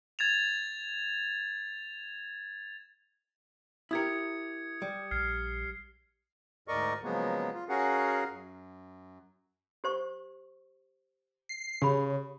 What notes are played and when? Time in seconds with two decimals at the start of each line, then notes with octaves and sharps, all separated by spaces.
0.19 G#6 A6 E7 F7
3.91 E4 G4 A#4 D#6 G#6 C#7
4.82 G3
5.11 A#1 F6 G#6 C7
6.68 D2 G#2 A#4 D5 D#5 C#6
7.04 C#3 F3 F#3 G#3 A#3 B3
7.55 F4
7.69 C#4 F#4 G#4 A#4 F5 F#5
8.30 F#2
9.84 G4 C5 C#6
11.49 C7
11.82 C#3 G4 B5